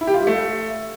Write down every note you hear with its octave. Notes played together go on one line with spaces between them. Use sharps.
E4
G4
F4
G3
A3